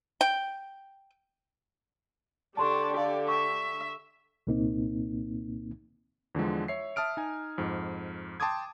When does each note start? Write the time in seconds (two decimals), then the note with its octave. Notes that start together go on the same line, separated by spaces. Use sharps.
0.21 G5
2.57 D3 D4 G4 A4 A5 C6 C#6
2.97 D5 F5
3.28 E5 C#6
4.47 C2 A#2 A#3 C4 D#4
6.35 E2 D3 F3 G#3
6.68 C#5 E5 C7
6.96 E5 A5 D#6 F6 D7
7.17 D#4 G#5
7.58 F2 G#2
8.40 G5 A5 C6 D6 D#6 G#6